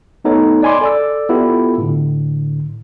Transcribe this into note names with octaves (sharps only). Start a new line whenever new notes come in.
A3 B3 D#4 A4 C#5
D5 D#5 G#5 B5 C6 D6
A4 D5 E6
B3 E4 F4 G4 A4
A2 D3